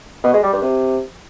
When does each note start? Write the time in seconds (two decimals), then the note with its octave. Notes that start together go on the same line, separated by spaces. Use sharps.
0.24 B2
0.34 G#3
0.43 G3
0.53 G2
0.62 C3